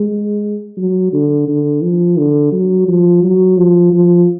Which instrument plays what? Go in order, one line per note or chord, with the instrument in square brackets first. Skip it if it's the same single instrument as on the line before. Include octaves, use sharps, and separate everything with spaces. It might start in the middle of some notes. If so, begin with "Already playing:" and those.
Already playing: [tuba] G#3
F#3
D3
D3
F3
D3
F#3
F3
F#3
F3
F3